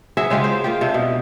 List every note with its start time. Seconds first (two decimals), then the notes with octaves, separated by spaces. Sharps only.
0.17 F#3 G#4 E5
0.30 C#3 G#3 F4 G4
0.44 C5
0.64 A#3 F4 G4
0.81 C3 D4
0.94 B2